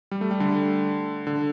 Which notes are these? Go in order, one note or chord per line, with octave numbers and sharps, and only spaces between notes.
G3
A3
G3
D3
D3